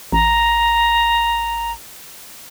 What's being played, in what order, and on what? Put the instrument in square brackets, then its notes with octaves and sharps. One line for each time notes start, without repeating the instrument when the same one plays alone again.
[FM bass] A1 [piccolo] A#5